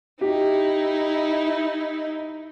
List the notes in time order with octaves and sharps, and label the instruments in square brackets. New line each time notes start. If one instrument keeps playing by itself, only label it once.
[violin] D#4 E4 [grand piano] G4